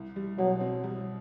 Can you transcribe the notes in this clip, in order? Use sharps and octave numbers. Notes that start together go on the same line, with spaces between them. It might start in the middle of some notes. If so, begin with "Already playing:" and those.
Already playing: C2
G3
B2 F#3
C4
G3